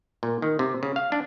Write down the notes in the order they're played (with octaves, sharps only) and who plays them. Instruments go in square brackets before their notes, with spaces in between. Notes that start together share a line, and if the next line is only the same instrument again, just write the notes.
[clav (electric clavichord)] A#2
D#3
C3
C#3
F5
D4